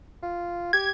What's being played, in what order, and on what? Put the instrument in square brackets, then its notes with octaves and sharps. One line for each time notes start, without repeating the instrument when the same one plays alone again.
[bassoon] F4
[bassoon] G4 [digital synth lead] G#6